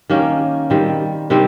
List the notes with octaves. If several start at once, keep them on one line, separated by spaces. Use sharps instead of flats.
D#3 A#3 C#4 G4
D#3 G3 C4
C3 D#3 G3 C4